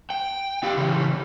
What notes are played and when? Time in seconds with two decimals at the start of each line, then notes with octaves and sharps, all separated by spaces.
0.10 G5
0.63 G4 F5
0.77 C#3 E3